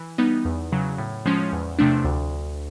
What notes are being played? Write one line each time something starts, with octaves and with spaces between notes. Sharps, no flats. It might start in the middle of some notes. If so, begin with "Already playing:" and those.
Already playing: E3
G3 B3 D#4
E2
C#3 F#3
A2
F3 G#3 C#4
E2
C3 F3 A3 D4
D2